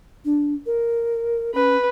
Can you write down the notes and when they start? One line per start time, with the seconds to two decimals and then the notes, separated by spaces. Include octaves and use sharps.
0.25 D4
0.66 A#4
1.55 C#4 B4